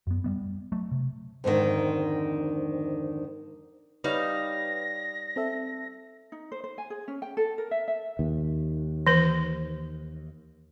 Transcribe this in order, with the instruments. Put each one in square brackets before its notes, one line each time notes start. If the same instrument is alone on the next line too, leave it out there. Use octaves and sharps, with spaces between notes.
[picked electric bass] F#2 B3
G3 G#3 B3
F#3 A3
C3
[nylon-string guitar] F2 G#2 D3 D#3
[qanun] G3 D#4 F5 [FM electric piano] B4 C#5 [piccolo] A#6
[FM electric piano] C4 A4 E5
[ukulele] D#4
C5
C5
G#5
G#4
C#4
G5
A4
A#4
E5
E5
[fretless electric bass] D#2
[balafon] E3 B4